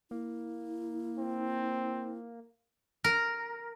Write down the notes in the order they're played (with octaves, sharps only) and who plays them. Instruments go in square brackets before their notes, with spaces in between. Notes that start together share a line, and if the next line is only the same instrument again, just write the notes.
[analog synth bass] A#3 [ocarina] E4
[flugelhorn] C4
[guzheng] A#4